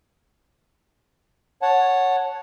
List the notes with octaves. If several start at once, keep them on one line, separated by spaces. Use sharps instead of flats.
C#5 F#5 A5